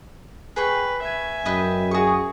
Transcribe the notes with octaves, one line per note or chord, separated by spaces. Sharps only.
G#4 B4 G5 C#6
E5 G#5
F#2 B4 D#5 G5
F#4 G#4 C#6